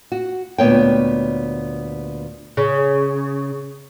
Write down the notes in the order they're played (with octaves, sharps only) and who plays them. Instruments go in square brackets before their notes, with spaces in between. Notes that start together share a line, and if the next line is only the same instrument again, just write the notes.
[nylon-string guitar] F#4
D2 A#2 B3 C#5 G5
[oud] C#3